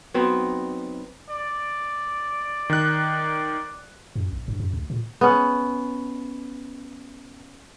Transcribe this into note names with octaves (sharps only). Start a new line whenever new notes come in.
F#3 B3 C4 D#4
D5
D#3 F#6
F#2
A#1
G2
F#2
D2
A#2
B3 C#4